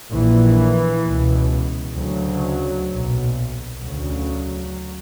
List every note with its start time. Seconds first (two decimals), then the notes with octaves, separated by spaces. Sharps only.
0.12 A#1 A#2 E3
1.05 C#2 B2
1.96 D2 C#3 F#3
2.90 B1 A#2
3.81 D2 C#3 F#3